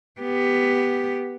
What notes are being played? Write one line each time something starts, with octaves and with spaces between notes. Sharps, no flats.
B3 G4